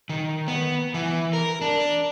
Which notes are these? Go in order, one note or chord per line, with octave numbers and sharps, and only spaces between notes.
D#3
B3
E3
A#4
D4